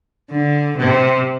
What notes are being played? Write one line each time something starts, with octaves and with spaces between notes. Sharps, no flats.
D3
C3